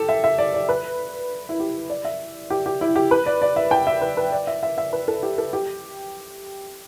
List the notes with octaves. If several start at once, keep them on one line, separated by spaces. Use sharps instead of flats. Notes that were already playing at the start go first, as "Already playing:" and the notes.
Already playing: G4 A4
E5
E5
D5
D5
B4
E4
G4
D5
E5
G4
G4
E4
G4
B4
D5
D5
E5
G5
E5
B4
B4
D5
E5
E5
E5
B4
A4
G4
A4
G4